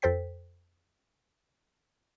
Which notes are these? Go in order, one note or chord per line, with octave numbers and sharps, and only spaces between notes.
F2 A4 C5 G5 B6